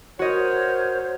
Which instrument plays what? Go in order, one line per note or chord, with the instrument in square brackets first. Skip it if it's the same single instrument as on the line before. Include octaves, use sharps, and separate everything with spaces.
[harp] F#4 D#5 [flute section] A#4 C5 C#5